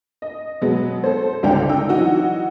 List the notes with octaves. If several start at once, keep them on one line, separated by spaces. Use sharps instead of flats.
D#5
B2 F#3 G#3 B3
A4 C5
G1 C#2 D3 D4 G5
D#4 G5 E6
E3 F#3 D#4 F#4